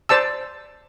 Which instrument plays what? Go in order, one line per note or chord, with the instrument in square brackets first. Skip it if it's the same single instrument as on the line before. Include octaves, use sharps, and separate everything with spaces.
[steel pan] C5 D5 A5 E6